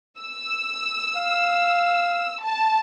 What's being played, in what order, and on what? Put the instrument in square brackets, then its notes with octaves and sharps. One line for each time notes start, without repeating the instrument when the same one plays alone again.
[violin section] E6
[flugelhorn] F5
[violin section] A5